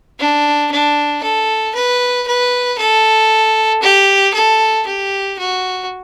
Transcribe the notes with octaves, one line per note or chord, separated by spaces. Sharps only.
D4
D4
A4
B4
B4
A4
G4
A4
G4
F#4